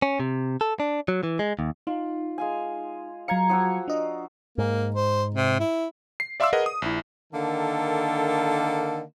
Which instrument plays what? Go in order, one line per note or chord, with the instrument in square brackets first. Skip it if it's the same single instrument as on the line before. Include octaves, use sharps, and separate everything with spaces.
[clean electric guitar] C#4
C3
A4
D4
F#3
E3
G#3
D#2
[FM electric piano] D#4 [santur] F4
[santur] G#3 F5 G#5
[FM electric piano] F#3 G#6 C#7 [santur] F5 A#5
[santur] F3 F#4 E6
[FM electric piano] D4 D#5
[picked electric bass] G#2 [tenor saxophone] A#3
[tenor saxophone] C5
C3
E4
[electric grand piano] C7
D5 E5 F5 C6 D6 E6
G#4 A#4 B4 D#5 F#5
D#6
A#1 E4
[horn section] D3 D#3 A#3 A4